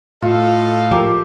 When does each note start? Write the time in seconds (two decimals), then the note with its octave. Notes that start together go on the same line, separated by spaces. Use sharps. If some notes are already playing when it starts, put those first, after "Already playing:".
0.22 A2 F4 A4 D#5 F5
0.91 F3 G4 A#4 D5